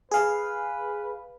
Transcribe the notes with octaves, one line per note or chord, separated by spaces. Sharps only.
G#4 B4 F5